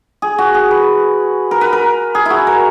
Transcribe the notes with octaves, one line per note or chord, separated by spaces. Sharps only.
G#4
F#4
G#4
B4
A#4
B4
A#4
G#4
E4 F#4
A#4